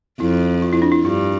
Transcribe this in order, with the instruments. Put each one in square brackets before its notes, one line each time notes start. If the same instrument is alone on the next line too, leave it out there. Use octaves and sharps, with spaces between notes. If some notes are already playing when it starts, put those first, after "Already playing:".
[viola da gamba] F2 [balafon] E4
[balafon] F4
E4
D4
E4
[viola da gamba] G2 [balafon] F4